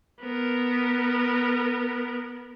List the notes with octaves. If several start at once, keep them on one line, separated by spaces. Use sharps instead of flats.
B3 A#4